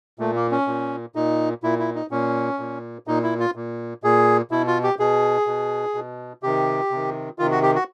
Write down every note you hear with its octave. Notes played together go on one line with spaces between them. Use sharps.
A#2 A3
A#3
C#4
A#2
A#2 D#4
A#2 E4
E4
D#4
A#2 C#4
A#2
A#2 D#4
E4
F4
A#2
A#2 G#4
B2 E4
F4
G4
B2 G#4
B2
B2
C3 D#3 G4
C3 D#3
C3 D#3 F4
F#4
G4
F#4